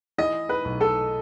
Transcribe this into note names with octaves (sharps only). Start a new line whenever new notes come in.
E3 D#5
B4
B1
A4